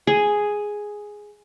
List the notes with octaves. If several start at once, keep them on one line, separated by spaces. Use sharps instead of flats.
G#4